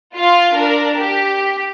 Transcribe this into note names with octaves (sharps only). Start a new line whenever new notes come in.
F4 F5
D4 A#4
G4